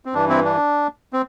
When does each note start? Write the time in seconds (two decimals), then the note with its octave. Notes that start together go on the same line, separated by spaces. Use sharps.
0.05 C4
0.14 G2 E3 D4
0.29 C4 E4
0.44 D4
1.13 C4